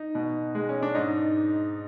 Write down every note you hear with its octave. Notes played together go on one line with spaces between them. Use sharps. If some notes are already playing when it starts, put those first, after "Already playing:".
Already playing: D#4
B2
G#3
C#4
D4
G#2 D#4